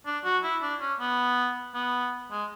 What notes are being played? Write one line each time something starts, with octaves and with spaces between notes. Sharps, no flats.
D4
F#4
E4
D4
C#4
B3
B3
G#3